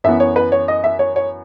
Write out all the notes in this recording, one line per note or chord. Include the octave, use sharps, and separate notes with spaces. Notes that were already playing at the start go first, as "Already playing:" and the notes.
F#2 E3 B3 E5
C#5
B4
C#5
D#5
E5
C#5
C#5